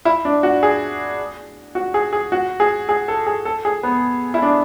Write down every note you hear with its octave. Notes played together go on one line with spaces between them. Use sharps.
E4
D4
F#4
G#4
F#4
G#4
G#4
F#4
G#4
G#4
A4
G#4
A4
G#4
B3
E4
D4